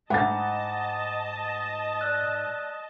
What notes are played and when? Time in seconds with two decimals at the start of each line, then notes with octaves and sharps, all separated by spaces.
0.10 G#2 D#5 F#5 G#5 A5 B5 D6 A6
2.01 D5 E6 F#6